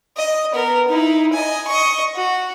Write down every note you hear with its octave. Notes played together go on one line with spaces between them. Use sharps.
D#5
B3 A#4
D#4 E4
D#5 G#5
D#5 C#6
F#4